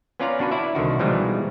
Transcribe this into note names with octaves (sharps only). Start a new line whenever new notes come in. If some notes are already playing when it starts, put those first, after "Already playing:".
B3 C#4 F4 D5 F5 A#5
D4 F#4 B4
E4 D5 E5
C2 D3 D#3 F#4
B2 E3 F3 G3 G#3 D#4